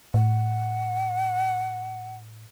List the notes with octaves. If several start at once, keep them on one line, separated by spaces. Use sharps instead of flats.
A2 F#5